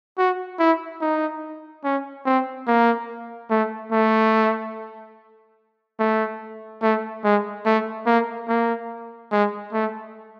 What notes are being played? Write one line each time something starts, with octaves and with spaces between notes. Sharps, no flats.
F#4
E4
D#4
C#4
C4
A#3
A3
A3
A3
A3
G#3
A3
A#3
A#3
G#3
A3